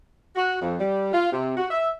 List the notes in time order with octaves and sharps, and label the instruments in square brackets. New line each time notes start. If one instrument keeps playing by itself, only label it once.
[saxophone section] F#4
F2
G3
F4
C3
F#4
E5